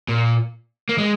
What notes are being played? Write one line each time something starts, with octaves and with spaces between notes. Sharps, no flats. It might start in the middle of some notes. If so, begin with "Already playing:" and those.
A#2
A#3
G#3